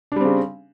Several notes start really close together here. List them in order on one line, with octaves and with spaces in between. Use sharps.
D4 G3 C4 C#3